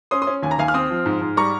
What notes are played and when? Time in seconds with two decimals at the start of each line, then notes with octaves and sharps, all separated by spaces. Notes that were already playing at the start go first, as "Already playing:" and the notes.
0.11 C#4 C6 D#6
0.22 C6 D#6
0.27 C#4
0.43 D#2 G#5
0.51 A#5
0.58 D#2 F5 G#5
0.68 F6
0.74 C4 C6 D#6
0.90 F3
1.06 G#2
1.21 G#2
1.37 G3 A#5 C#6